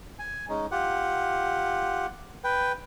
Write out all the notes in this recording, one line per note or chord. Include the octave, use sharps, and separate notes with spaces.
G#5
G#3 C#4 D#4
F4 G4 F#5
B4 G5